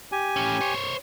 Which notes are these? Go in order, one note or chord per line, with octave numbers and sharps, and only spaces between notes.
G4 G#5
A2 C#4
C5 C#5